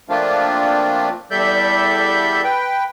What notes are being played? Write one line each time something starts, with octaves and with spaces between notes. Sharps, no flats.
F3 A3 A#3 C4 D4 F4
E2 G3 A4 D5 E5 G6
B4 G5